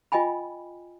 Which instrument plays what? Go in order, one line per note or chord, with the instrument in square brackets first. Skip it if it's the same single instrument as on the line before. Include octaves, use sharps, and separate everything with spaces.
[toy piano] F4 D#5 G5 G#5 B5